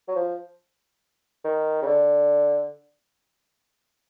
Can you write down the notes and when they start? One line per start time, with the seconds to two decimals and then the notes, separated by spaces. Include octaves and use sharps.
0.08 F#3
0.16 F3
1.45 D#3
1.82 C#3
1.87 D3